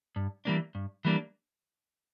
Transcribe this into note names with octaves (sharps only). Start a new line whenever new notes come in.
G2
E3 G3 A#3 D4
G2
E3 G3 A#3 D4